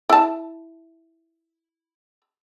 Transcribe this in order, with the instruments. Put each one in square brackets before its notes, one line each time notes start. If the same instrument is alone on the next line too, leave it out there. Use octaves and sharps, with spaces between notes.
[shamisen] E4 A5